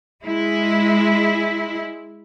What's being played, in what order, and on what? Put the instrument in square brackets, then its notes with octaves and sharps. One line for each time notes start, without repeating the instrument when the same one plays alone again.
[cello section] G#3 E4